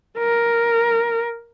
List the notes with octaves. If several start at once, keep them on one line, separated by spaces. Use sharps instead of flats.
A#4